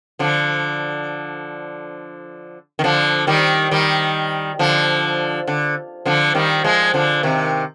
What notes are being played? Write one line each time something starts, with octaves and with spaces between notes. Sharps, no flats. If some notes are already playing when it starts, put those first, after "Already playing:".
D3 F3
D#3
D3 F3
D#3 G3
D#3 G3
D3 F3
D3
D3 F3
D#3 G3
F3 G#3
D3 F3
C3 D#3